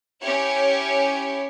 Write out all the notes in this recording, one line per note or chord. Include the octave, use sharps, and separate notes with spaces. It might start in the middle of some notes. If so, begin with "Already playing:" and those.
C#4 E4 G4 C#5